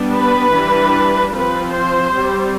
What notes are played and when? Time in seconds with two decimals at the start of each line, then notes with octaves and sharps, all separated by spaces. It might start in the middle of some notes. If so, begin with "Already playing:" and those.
Already playing: G3 B3 D4
0.15 B4
0.54 E3 G3 D4
1.34 F3 C4 B4
1.73 C5
2.13 G3 C4